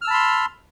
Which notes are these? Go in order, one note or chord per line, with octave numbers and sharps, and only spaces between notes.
A5 B5 C6 E6 F6